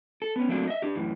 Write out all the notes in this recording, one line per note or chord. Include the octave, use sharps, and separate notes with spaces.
A4
B3 C#4
F#3 A3 A#3 C4 D4 F#4
D#5 E5
D4 G4
F#2 A2 E3